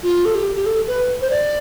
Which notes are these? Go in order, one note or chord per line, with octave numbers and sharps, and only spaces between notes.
F4
A4
G4
G4
A4
B4
C5
D5